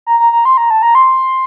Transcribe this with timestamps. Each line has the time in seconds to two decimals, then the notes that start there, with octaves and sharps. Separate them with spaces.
0.07 A#5
0.20 A#5
0.32 A#5
0.45 C6
0.57 A#5
0.70 A5
0.82 A#5
0.95 C6